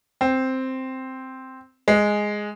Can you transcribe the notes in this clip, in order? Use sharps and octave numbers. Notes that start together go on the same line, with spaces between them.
C4
G#3